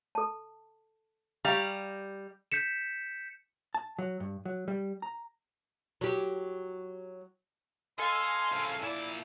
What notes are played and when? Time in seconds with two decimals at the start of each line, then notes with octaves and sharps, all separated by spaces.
0.15 A4 A5
1.45 G3 G4 F5 A#5
2.52 G6 B6 C#7 E7
3.74 A5
3.99 F#3
4.20 G2
4.45 F#3
4.68 G3
5.02 A#5
6.01 F#3 G4
7.99 A4 D#5 F5 G#5 C6
8.52 C2 C#3
8.82 A#2 E4 D5 A5